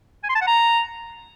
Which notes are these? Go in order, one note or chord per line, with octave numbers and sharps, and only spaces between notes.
G#5
C6
A5
F#5
A#5